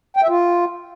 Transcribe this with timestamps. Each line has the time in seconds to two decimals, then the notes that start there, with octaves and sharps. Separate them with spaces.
0.17 G5
0.23 E5
0.29 F4